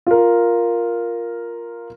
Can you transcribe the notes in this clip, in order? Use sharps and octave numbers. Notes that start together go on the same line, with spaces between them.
F4 A#4